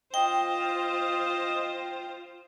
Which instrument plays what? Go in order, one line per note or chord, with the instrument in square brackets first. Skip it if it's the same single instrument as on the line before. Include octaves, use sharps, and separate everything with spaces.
[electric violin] F4 C5 [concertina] D#5 [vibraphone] G5